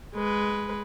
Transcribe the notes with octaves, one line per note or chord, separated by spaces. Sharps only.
G#3 B4